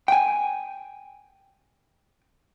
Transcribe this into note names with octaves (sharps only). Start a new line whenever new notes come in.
G5 G#5